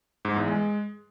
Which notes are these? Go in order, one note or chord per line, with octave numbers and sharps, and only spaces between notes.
G#2
E2
G#3